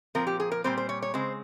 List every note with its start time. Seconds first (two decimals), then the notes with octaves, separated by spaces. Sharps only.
0.15 A#2 F3 C4 A#4
0.27 G4
0.40 G#4
0.52 A#4
0.64 A#2 G3 C4 C5
0.78 C5
0.89 C#5
1.02 C#5
1.14 C#3 G#3 C4 C5